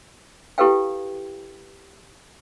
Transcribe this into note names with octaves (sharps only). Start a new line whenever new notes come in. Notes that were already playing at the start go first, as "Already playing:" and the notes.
E4 G4 A4 B4 F5 G5